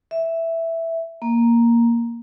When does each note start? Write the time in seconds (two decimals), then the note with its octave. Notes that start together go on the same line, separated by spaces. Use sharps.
0.11 E5
1.22 A#3